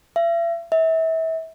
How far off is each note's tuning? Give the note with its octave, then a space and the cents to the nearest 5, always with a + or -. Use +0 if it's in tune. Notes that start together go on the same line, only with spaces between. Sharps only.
E5 +40
E5 -30